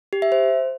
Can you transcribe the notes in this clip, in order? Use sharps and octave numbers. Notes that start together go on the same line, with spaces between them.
G4
E5
C5